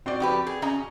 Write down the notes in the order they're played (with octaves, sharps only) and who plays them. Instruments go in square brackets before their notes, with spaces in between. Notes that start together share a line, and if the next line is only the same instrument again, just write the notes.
[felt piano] C4 F#4 D5
[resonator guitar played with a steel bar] F2 G4 B4
G#4
C#4 D#5 A#5